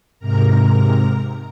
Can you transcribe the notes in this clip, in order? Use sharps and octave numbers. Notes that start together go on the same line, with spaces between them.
G#2 C3 A#4 A#5